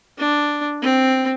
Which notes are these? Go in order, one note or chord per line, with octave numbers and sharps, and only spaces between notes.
D4
C4